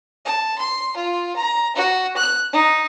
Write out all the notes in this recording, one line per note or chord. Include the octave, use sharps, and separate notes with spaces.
A5
C6
F4
A#5
F#4
F#6
D#4